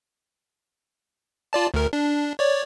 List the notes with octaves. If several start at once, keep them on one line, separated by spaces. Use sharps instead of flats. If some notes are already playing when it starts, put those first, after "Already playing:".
F4 D5 A5
D2 A#4
D4
C#5 D5